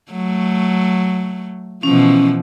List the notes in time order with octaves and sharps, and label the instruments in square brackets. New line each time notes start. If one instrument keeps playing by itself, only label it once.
[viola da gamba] F#3 A3
[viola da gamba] B2 E3 F3 [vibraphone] C#4